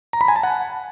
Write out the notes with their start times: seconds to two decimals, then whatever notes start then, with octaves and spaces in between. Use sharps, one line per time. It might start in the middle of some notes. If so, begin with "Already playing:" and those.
0.13 A#5
0.21 B5
0.28 G#5
0.36 A5
0.43 F#5